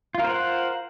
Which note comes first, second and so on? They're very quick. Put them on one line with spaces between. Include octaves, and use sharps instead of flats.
F4 A#4 C5 F#5